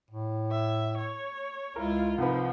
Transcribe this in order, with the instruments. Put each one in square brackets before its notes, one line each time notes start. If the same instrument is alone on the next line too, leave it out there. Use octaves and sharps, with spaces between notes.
[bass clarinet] A2
[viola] E5
C#5
[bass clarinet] C#2 [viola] E4 F4 [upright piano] A#4
[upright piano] C2 B4 [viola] F3 [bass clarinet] D#4